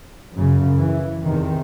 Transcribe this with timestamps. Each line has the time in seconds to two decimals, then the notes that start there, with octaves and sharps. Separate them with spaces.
0.34 F#2 C#3
0.79 E3
1.24 E2 C3 D#3